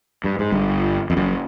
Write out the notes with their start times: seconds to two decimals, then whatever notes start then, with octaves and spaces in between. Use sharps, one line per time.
0.24 G2
0.39 G#2
0.52 G1 G2
1.10 F2
1.16 F#1 F#2